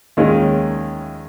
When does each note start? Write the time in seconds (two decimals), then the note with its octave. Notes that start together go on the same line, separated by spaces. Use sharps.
0.17 D#2 D#3 G#3 C#4 F4